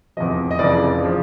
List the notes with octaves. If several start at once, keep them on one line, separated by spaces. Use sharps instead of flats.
F1 E2 C3 F3 D#5
D#5
F1 F2 C#3 E3 D5
C#3 F3